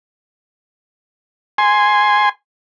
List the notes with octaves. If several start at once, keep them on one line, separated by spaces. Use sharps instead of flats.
G#5 C6